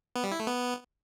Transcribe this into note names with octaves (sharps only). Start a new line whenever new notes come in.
B3
G3
E4
A3
B3